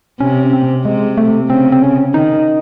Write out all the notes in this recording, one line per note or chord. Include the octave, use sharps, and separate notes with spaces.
C3 C#4
C4
C3 G#3
A3
C#3 C4
C4
C#4
D#3 D#4